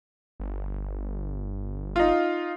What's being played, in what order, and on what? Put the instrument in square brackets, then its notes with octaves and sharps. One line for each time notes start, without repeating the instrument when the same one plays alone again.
[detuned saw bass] G1
[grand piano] D#4 F4